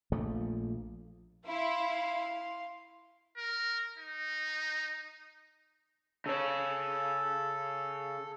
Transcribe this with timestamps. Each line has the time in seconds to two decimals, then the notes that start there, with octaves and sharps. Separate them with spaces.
0.12 A#1 F3 A3
1.46 E4 F5 C6
3.37 A#4
3.98 D#4
6.26 C#3 A4 C#5